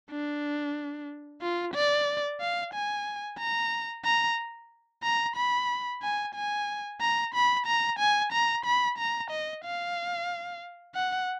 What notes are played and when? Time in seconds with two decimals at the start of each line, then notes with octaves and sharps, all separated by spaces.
0.10 D4
1.42 F4
1.75 D5
2.40 F5
2.74 G#5
3.38 A#5
4.05 A#5
5.04 A#5
5.36 B5
6.02 G#5
6.35 G#5
7.01 A#5
7.34 B5
7.66 A#5
7.99 G#5
8.32 A#5
8.65 B5
8.98 A#5
9.31 D#5
9.64 F5
10.95 F#5